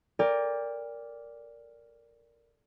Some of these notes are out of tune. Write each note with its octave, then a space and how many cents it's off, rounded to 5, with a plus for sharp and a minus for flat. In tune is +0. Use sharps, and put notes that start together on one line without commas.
A#4 +0 D5 -10 G5 +35